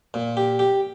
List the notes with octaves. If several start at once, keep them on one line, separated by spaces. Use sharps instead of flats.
A#2
G4
G4